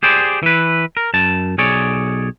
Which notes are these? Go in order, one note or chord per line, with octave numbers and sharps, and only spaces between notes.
G4 G#4 C5 D5
E3 B4
A#4
F#2 A5
B1 G#4 C#5 D5